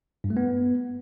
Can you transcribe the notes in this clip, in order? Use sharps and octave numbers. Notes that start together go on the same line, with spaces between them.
G2
A3
B3